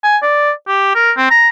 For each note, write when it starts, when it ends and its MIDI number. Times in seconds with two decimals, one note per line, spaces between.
0.04 0.17 80
0.23 0.51 74
0.68 0.90 67
0.95 1.12 70
1.17 1.29 60
1.30 1.49 82